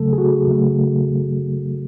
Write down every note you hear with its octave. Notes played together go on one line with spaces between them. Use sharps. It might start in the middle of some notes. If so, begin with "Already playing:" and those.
Already playing: C#3 F#3 A3 A4
G#4
F#4
C#3 F#3 A3